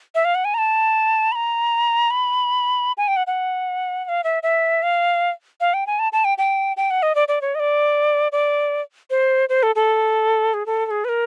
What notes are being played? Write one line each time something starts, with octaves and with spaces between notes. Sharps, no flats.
E5
F5
F#5
G#5
A#5
A5
B5
A#5
B5
G#5
G5
F#5
F#5
F#5
F5
E5
E5
F5
F5
G5
G#5
A5
A5
G5
G5
G5
F#5
D#5
D5
D5
C#5
D#5
D5
D5
C5
C5
A4
A4
G#4
A4
A4
G#4
B4
A#4